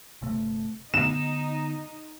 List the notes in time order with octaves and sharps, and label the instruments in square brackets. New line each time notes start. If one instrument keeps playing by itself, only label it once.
[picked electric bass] G1 C3 A3
[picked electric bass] D3 B3 [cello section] D#4 [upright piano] E7